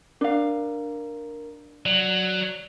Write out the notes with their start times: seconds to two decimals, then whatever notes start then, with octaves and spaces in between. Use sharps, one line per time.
0.21 D4 A#4 F5
1.86 F#3 D5